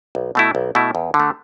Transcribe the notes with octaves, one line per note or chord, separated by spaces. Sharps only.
B1
B2 A3 E4
B1
B2 A3 E4
E2
D3
A3